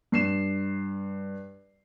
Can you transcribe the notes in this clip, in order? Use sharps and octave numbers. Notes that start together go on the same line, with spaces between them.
G2 C7 E7